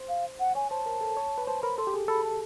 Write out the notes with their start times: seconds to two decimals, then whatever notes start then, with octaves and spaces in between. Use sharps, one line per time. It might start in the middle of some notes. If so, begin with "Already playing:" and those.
Already playing: C5
0.09 F5
0.40 F#5
0.55 C#5 G#5
0.70 C5 A5
0.86 A#4
1.01 A4
1.17 C#5
1.38 B4
1.47 C5 A5
1.62 A#4 B5
1.78 A4 C6
1.87 G4
1.94 G#4
2.08 A4 B5
2.24 A5